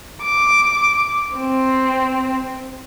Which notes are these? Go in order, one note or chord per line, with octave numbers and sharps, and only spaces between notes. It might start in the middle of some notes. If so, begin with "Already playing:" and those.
D6
C4